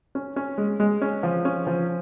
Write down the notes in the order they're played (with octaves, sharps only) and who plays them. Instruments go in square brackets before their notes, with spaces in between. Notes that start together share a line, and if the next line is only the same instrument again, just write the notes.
[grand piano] C#4
C#4
G#3
G#3
C#4
F3
C#4
F3